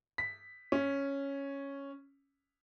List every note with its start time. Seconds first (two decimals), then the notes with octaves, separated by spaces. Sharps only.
0.18 B6
0.72 C#4